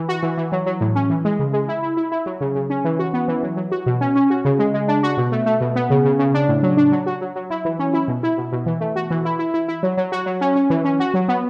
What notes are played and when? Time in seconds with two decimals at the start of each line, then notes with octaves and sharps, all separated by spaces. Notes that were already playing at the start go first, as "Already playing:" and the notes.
Already playing: E3
0.09 F#4
0.23 E3
0.38 E3
0.52 F#3
0.66 F#3
0.81 A2
0.95 C#4
1.10 E3
1.25 G#3
1.39 C#3
1.53 G#3
1.68 E4
1.83 E4
1.97 E4
2.12 E4
2.26 F#3
2.41 C#3
2.55 C#3
2.70 C#4
2.85 E3
2.99 F#4
3.13 B3
3.28 E3
3.43 F#3
3.57 F#3
3.72 F#4
3.86 B2
4.01 C#4
4.15 C#4
4.30 F#4
4.45 C#3
4.59 G#3
4.74 G#3
4.88 D4
5.03 F#4
5.17 B2
5.32 A3
5.46 A3
5.61 B2
5.76 B3
5.90 C#3
6.05 C#3
6.19 C#3
6.34 D4
6.48 A2
6.63 F#3
6.77 D4
6.92 F#3
7.06 F#4
7.21 F#3
7.36 F#3
7.50 E4
7.65 E3
7.79 C#4
7.94 E4
8.08 B2
8.23 E4
8.38 B2
8.52 B2
8.66 E3
8.80 A3
8.96 F#4
9.11 E3
9.25 E4
9.39 E4
9.54 E4
9.68 E4
9.83 F#3
9.97 F#3
10.12 F#4
10.26 F#3
10.41 C#4
10.56 C#4
10.70 E3
10.85 C#4
11.00 F#4
11.14 F#3
11.28 B3